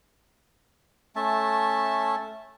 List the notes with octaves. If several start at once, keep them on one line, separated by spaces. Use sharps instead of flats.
A3 C#4 E5 A5